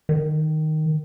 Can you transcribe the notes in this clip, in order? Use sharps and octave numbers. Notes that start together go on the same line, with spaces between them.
D#3